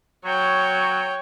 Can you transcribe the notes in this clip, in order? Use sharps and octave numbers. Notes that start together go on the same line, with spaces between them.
F#3 C#5 G5